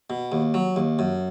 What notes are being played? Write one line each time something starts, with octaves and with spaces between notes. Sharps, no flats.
B2
D#2
F#3
D#2
F#2